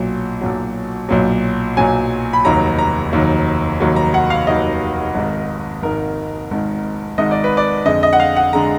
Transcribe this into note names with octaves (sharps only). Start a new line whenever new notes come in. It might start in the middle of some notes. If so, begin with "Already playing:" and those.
Already playing: B1 A#2 F#3
B1 A#2 F#3
B1 A#2 F#3
B1 A#2 F#3 G#5
B5
F1 D#2 D#3 F#3 A#5
A#5
F1 D#2 D#3 F#3
F1 D#2 D#3 F#3
A#5
F#5
F5
F1 D#2 D#3 F#3 D#5
G#1 G#2 D#3
G#1 G#2 D#3 A#4
G#1 G#2 D#3
G#1 G#2 D#3 D#5
D5
B4
D5
F2 D3 G#3 D#5
D#5
F#5
F5
F#5
D3 G#3 A#5